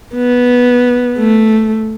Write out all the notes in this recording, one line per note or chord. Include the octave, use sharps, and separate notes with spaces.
B3
A3